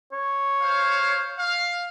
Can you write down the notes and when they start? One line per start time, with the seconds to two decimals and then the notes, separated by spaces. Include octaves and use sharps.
0.12 C#5
0.61 C5 F5
1.38 F5